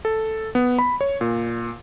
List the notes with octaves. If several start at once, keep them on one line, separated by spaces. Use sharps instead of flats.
A4
B3
B5
C#5
A#2